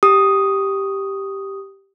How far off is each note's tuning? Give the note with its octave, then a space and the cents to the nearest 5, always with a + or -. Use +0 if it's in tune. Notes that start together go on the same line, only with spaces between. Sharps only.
G4 +0 D#6 +0